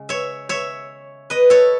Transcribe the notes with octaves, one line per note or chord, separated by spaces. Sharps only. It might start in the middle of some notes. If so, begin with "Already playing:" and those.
Already playing: C#3 G#3
C#5 E5
C#5 E5
B4 D#5
A4 C#5